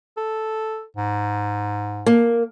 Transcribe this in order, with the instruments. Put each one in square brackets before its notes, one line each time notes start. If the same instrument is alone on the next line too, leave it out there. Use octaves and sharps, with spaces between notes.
[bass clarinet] A4
G#2
[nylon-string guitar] A#3